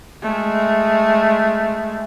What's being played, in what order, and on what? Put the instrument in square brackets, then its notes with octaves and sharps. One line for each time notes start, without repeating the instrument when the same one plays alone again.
[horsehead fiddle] G#3 A3